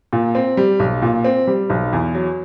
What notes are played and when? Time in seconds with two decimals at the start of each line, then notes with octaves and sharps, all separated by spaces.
0.13 A#2
0.35 C4
0.57 G3
0.80 B1
1.02 A#2
1.24 C4
1.47 G3
1.70 B1
1.93 E2
2.15 F#3